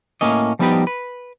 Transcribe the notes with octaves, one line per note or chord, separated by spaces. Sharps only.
A2 A#3 C#4 D#5
F3 G3 B3 D#4 G4 B4
B4